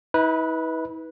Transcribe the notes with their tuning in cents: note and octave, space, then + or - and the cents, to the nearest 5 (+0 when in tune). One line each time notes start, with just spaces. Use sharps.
E4 -45 B4 -10